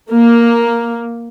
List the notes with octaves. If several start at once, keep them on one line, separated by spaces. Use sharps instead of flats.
A#3